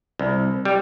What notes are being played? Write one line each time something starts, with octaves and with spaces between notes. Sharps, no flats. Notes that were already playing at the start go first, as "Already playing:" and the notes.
C2
G3